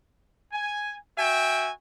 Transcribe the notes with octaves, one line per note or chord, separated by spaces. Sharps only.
G#5
F#4 E5 G5 G#5